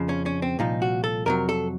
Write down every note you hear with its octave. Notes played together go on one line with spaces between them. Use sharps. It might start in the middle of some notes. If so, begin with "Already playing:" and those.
Already playing: F2 C#3 F3
C#4
C#4
C4
C2 A#2 F3 D#4
F#4
A4
F2 C3 F#3 A#4
A4